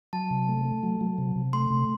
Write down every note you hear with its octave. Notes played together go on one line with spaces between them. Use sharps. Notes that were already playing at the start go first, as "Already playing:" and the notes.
F#3 A5
C3
A3
A3
F#3
F#3
C3
C3
A3 C6
C3